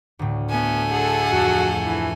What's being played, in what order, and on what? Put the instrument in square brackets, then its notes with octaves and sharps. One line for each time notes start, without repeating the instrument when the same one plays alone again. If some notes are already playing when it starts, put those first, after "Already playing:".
[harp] D2 A2
[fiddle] A3 G#5 [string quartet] B3
[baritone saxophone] D3 [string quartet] G#4 A4 F#5
[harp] F2 [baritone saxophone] F#4
[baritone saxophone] E3